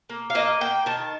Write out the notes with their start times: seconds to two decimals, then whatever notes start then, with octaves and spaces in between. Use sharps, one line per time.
0.10 A#3
0.30 F5
0.35 A#3 D#5
0.61 A#3 G5
0.86 D#3 A5